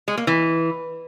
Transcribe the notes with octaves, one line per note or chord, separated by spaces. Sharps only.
G#3
A#3
E3